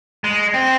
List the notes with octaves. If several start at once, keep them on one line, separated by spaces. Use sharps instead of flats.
G#3
C4